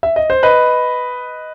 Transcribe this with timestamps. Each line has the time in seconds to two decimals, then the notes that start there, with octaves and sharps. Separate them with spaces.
0.03 E5
0.16 D#5
0.30 C5
0.43 B4 D#5